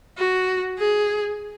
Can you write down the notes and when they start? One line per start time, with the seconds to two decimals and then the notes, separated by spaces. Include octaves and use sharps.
0.18 F#4
0.78 G#4